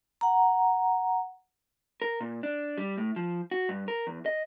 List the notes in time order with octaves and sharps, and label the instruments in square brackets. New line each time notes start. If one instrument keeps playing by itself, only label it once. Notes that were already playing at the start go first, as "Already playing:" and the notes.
[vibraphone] F#5 A#5
[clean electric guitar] A#4
A#2
D4
G3
A2
F3
F#4
G2
A#4
E2
D#5